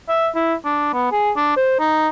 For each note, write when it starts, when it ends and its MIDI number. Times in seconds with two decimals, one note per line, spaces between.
0.09 0.29 76
0.35 0.54 64
0.65 0.93 62
0.93 1.09 59
1.12 1.31 68
1.36 1.52 62
1.57 1.77 72
1.80 2.08 63